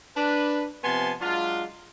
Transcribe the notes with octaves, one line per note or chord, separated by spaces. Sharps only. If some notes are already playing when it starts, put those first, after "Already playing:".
D4 B4
C3 F3 B3 G#5 A5 C6
F#3 G#3 D4 F4